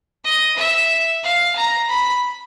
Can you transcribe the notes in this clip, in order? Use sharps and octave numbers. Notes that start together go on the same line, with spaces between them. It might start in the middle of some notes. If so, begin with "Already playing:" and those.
D#5
E5
F5
A#5
B5